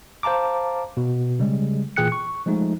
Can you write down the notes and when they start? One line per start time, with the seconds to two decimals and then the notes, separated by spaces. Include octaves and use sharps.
0.23 C5 F5 A5 A#5 D6
0.97 B2
1.39 C#3 G3 G#3
1.96 A#2 E3 G#4 G5 F#6 C#7
2.12 C#6
2.46 F3 G#3 A3 D#4